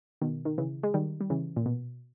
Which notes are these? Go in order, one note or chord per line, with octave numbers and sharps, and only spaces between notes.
B2 D#3
D#3
C#3 E3
G#3
D#3 G3
G3
C#3 E3
A#2
B2